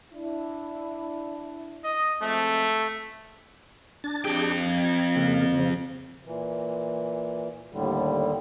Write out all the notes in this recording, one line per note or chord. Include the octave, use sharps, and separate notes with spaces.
D4 E4
D#5
F3 G#3 A3 C4
D4 A6
F2 D4 G4 G#4 G5
G#6
C#3 A#3
C#3 F3
A#2 E3
D#2 A2 D3 G3